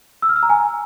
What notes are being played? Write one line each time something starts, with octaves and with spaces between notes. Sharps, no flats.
E6
F6
E6
A#5
G#5